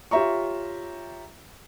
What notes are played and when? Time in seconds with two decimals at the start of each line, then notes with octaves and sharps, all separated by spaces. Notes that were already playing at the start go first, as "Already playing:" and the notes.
0.11 F4 G4 C#5 E5 A#5 C#6